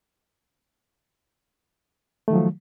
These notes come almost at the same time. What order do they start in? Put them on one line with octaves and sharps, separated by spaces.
A3 D#3 F#3 F3